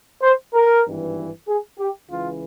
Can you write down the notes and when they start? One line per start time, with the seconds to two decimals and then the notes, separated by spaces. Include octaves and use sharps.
0.22 C5
0.54 A#4
0.85 G#1 G2 E3
1.47 G#4
1.79 G4
2.09 C#2 C#3 E3 F4